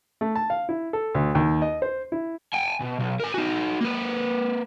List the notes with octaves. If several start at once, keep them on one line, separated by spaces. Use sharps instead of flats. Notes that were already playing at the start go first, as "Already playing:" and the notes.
A3
A5
F5
E4
A4
D2
D#2
D#5
C5
E4
G5 G#5
B2
B1
A#4 G#5
D#4 F#4
A#3 B4